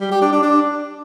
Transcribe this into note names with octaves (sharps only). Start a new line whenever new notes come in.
G3
G4
D4
D4
D4